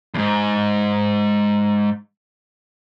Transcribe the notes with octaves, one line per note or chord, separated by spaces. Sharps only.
E2 G#2